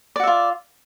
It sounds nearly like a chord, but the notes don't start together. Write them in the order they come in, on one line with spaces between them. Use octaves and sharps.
D5 F#4 E5 F4